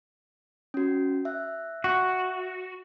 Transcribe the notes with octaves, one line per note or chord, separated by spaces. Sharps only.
C#4 F#4
E5 F#6
F#4